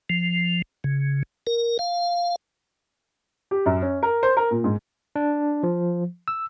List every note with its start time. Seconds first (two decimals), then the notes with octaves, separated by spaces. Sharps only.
0.10 F3
0.84 C#3
1.47 A#4
1.79 F5
3.51 G4
3.66 F#2
3.82 C#4
4.03 A#4
4.23 C5
4.37 A#4
4.51 A#2
4.64 G#2
5.16 D4
5.63 F3
6.28 E6